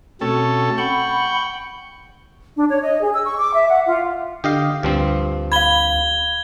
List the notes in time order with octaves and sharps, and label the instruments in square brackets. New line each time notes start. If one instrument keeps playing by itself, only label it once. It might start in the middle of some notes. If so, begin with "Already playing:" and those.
[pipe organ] B2 C4 [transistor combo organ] A3 C#4 A4
[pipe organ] F#5 B5 [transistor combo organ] G5 C#6
[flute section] D4
C#5
D#5
G#4
E6
C#6
D6
E5
F#5
F4
[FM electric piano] D3 [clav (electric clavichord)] G4 D#5 F5
[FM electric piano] D2 [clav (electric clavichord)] G2 F3 C4
[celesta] F5 B5 [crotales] G#6 G7